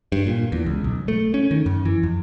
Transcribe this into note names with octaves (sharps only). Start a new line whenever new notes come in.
G2
A#2
E2
C#2
B1
A3
C#4
D#3
F#2
E3
F2